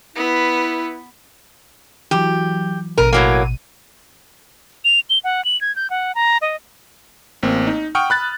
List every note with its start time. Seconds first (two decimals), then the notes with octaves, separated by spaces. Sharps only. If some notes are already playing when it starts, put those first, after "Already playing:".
0.16 B3 E4 B4
2.11 E3 F#3 G4
2.98 A1 B2 A#4 D#7
3.13 A2 F#3 A#3
4.85 F7
5.10 G7
5.24 F#5
5.45 F#7
5.61 G#6
5.76 G6
5.90 F#5
6.15 A#5
6.42 D#5
7.43 A1 A#3 C4
7.67 D#4
7.95 F#5 G5 C#6 D#6 F6
8.10 B5 F#6 A6